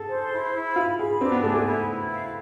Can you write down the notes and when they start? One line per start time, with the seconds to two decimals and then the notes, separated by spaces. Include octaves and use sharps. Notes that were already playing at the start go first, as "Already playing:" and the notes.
Already playing: G#4 A4
0.09 C5
0.32 E4
0.54 E4
0.76 F4 B5
0.99 G#4 B5
1.21 C4 D4
1.32 B3
1.44 A3 G#4
1.55 A3
1.66 E4
1.89 E4
2.12 F5